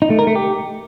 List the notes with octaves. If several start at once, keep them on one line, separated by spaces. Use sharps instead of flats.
D#4
A3
A#4
A3
G4